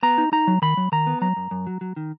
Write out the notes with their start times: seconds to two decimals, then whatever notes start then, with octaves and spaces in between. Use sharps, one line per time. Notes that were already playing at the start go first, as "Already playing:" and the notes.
0.03 B3 A#5
0.18 D#4
0.32 D#4 A#5
0.47 F#3
0.62 D#3 B5
0.77 F#3
0.92 D#3 A#5
1.07 B3
1.21 F#3 A#5
1.37 F#2
1.51 F#2
1.67 F#3
1.81 F#3
1.96 D#3